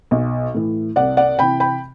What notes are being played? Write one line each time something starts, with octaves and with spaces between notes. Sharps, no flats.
B1
A2 E3
C2 D5 F#5
D5 F#5
C3 E3 G5 B5
G5 B5